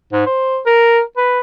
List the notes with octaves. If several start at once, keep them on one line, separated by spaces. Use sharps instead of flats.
G#2
C5
A#4
B4